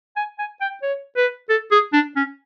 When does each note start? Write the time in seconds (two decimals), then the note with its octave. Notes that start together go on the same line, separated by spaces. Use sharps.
0.16 G#5
0.39 G#5
0.61 G5
0.82 C#5
1.17 B4
1.49 A4
1.72 G#4
1.93 D4
2.16 C#4